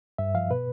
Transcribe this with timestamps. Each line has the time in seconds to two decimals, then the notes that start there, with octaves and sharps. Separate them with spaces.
0.18 G2 E5
0.34 F3 F5
0.50 B2 B4